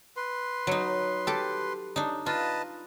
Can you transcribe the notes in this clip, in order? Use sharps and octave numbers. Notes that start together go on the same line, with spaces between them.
B4 C6
F#3 D#4
G4 A4
D4 D#4
F4 B4 D#5 A5